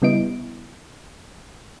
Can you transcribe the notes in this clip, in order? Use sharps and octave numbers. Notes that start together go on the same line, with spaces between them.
C#3 G3 B3 E4 D#5 D7